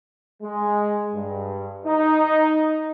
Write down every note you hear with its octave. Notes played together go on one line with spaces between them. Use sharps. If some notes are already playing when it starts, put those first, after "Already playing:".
G#3
G2
D#4